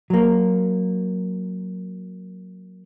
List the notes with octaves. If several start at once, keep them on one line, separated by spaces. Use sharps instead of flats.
F#3 A#3